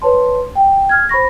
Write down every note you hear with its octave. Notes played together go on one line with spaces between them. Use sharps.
B4 C#5 A5 C6
G5
F6 G#6
C5 B5 C#6 A#6